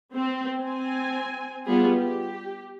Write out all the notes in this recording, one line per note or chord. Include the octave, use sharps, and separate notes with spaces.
C4
C4 G#5
G3 B3 F4 G#4
G4